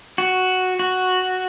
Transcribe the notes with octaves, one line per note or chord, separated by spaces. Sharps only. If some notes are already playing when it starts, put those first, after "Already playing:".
F#4
F#4